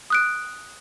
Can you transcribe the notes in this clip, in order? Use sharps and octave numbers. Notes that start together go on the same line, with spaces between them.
D#6 F#6 D7